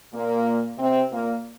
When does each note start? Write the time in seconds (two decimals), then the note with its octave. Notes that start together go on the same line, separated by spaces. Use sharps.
0.13 A#2 A#3
0.78 C3 C4
1.11 A#2 A#3